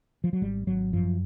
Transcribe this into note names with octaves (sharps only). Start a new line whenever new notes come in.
F3
F#3
G#1 G3
G#1 F#3
F#2 F3